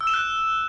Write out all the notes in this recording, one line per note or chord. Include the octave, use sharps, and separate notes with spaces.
E6
E7
F#6